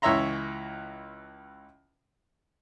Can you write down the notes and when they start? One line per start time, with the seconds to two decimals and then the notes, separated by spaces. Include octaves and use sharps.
0.02 C#2 E3 C#5 E5 A#5 C6